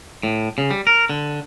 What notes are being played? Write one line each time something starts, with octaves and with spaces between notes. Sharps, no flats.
A2
C#3
G3
A#4
D3